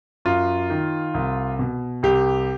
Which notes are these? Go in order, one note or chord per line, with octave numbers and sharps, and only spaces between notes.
F#2 F4
D#3
C2
B2
C2 G4